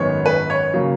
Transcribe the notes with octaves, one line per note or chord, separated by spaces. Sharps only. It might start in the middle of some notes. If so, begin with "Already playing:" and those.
Already playing: G#1 F#2 D#3 G#3 B3 C#5
B4
C#5
C#3 F#3 A#3